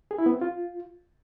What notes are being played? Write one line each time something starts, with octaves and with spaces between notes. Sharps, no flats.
G#4
E4
B3
C4
F4